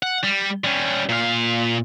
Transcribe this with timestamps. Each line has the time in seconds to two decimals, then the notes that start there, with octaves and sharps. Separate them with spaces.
0.03 F#5
0.24 G3
0.64 G3 C#4
1.09 A#2 F5